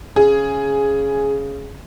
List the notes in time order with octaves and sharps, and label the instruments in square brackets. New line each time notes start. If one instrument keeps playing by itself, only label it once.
[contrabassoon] C#3 [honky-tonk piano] G#4